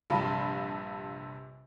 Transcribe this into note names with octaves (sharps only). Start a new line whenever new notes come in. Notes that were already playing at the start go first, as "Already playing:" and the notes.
A#1 G2 C3 F4 A5 B5